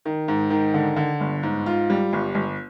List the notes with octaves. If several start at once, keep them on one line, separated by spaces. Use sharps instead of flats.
D#3
G#2
D#3
D3
D3
G1
G#2
F4
G3
G1
G1